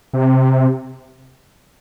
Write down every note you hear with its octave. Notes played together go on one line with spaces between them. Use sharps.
C3